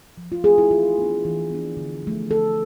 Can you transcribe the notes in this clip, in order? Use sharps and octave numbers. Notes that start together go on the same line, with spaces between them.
F3
F4
A3 C4 G#4
E4
E3 F4
B3 D4
E3
B3 D4
D3
F3 A3
D3 A4